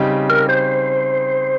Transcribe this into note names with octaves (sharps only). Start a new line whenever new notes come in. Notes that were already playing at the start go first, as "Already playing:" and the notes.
Already playing: C#3 G3 C4 D#4 G4
A#4
C5